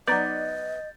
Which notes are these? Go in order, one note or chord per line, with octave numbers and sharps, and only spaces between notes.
F#3 B3 D#4 D5 D#5 G6 A6